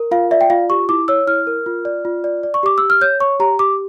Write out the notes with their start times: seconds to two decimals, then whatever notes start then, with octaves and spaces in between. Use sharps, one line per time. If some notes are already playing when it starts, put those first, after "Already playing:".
Already playing: A#4
0.11 F4 F5
0.31 D5 E5
0.41 G5
0.50 F4 F5
0.70 G4 C#6
0.89 E4 D6
1.08 C#5 E6
1.27 E4 F6
1.47 A#4
1.66 F4
1.85 D5
2.05 F4
2.24 D5
2.43 D5
2.54 C#6
2.63 G4 D6
2.78 G4 E6
2.90 F6
3.01 C#5 G6
3.20 C#5 C#6
3.40 G4 A#5
3.59 G4 D6